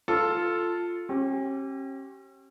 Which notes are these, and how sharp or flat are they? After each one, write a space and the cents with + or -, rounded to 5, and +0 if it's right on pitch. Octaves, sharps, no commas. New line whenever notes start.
F4 +0 A4 +0
C#4 -40 G4 -20